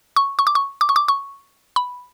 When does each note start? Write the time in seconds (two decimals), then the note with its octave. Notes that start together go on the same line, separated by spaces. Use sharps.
0.16 C#6
0.39 C#6
0.47 D6
0.55 C#6
0.81 D6
0.89 C#6
0.96 D6
1.08 C#6
1.76 B5